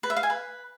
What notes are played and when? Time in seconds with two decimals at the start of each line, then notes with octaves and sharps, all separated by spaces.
0.03 B4
0.10 E5
0.17 F5
0.23 G#5
0.30 B4